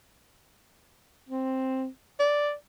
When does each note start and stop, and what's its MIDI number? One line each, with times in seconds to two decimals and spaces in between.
1.29 1.86 60
2.20 2.53 74